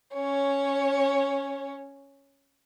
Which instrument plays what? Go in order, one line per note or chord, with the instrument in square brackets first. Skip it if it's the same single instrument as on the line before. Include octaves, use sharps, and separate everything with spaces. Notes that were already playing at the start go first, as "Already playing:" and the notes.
[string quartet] C#4 C#5